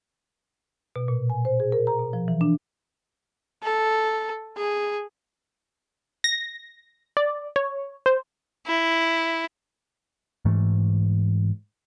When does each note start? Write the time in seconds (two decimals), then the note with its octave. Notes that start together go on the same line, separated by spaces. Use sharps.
0.96 B2
1.08 A#2
1.30 G#5
1.45 C5
1.60 G#4
1.72 A#4
1.87 A#5
1.99 B2
2.13 F3
2.28 E3
2.41 D4
3.63 A4
4.57 G#4
6.24 A#6
7.17 D5
7.56 C#5
8.06 C5
8.67 E4
10.45 G#2 E3 A3